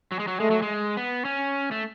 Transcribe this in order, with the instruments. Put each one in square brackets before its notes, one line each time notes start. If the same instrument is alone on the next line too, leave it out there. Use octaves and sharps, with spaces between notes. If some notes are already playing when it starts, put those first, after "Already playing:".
[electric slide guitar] F#3
G#3
F#3
[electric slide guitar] G#3 [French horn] A3
[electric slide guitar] F#3
G#3
B3
C#4
A3